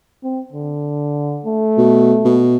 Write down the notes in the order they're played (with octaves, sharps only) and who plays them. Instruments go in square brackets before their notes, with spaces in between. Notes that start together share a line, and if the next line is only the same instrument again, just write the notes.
[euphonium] C4
D3
A3
[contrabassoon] B2
B2